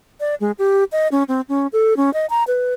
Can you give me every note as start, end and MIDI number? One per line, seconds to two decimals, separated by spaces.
0.20 0.35 74
0.40 0.52 56
0.59 0.84 67
0.92 1.08 75
1.12 1.23 61
1.28 1.41 60
1.49 1.67 61
1.73 1.96 69
1.97 2.13 61
2.14 2.26 75
2.30 2.44 82
2.47 2.74 71